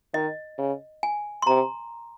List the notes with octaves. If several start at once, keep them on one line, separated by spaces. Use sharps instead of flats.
D#3 D#5
C#3
G#5
C6
C3 A#5